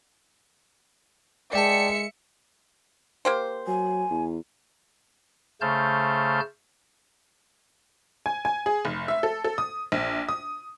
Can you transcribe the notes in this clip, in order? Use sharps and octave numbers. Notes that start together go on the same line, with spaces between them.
G#3 D5 E5 G5 A5 C#7
A#3 G4 C5
F#3 G#5
E2
C#3 A3 C5 A5 F6 G6
G#5
G#5
G#4
F1
E5
A4
A4
D#6
A#1
D#6